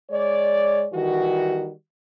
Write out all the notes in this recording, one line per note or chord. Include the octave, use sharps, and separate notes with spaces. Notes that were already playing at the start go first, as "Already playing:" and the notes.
G#3 C#5 D5
D#3 E3 G3 F#4